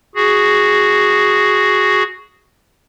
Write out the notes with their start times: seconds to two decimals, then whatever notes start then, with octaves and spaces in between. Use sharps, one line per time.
0.15 F#4 G#4